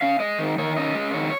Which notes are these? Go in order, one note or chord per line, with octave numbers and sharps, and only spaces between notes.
C#4 F5
G#3 D#5
D#3
D#3 C#5
C#4 D#5
G#3
D#3 C#5